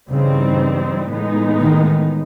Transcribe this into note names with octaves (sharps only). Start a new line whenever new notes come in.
G2 C#3 E3 G3 C4 D#4
A2 E3 G#3 B3 D#4
D#3